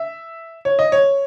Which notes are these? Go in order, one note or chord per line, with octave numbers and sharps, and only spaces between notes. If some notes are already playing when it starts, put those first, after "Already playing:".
Already playing: E5
C#5
D#5
C#5